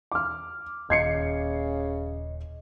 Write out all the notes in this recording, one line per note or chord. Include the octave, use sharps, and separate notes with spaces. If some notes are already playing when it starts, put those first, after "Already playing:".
D6 F6
D#1 C#3 D#5 G#6 C7 C#7